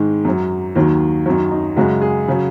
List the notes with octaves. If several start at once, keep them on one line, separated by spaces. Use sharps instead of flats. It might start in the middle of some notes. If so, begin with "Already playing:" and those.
Already playing: G#2 D#3 G#3
F#2 F#3
D#2 D#3 F#3
F#2 D#3 F#3
D#4
F#2 C#3 G#3 F#4
G#4
C#3 F#3